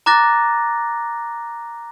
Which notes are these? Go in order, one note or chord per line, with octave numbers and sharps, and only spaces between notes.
A#5 D6 F#6 A6 A#6